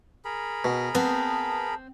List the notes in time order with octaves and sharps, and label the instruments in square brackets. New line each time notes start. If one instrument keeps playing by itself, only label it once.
[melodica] G#4 A#4 B5
[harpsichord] B2
[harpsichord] B3 [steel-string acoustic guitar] C4 [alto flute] A5